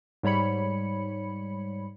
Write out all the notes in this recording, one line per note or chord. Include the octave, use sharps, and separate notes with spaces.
G#2 G3 C#5 B5 C#7